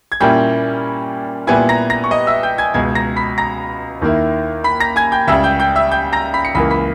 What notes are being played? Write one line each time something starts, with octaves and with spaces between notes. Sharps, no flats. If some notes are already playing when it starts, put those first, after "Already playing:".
G#6
A#2 G3 A#3 C#4 E4 G5 G6
A#2 G3 B3 E4 G#5 G#6
A#5 A#6
A#5 A#6
C#6
D#5 D#6
E5 E6
G5 G6
G#5 G#6
C#2 B2 G#3 G#5 G#6
A#5 A#6
B5 B6
A#5 A#6
D#2 D#3 A#3 E4
B5 B6
A#5 A#6
G#5 G#6
G5 G6
C#2 C#3 G3 E5 E6
G5 G6
G5 G6
E5 E6
G5 G6
A#5 A#6
B5 B6
C#7
C#2 C#3 E3 A#3 B5 B6
B5 B6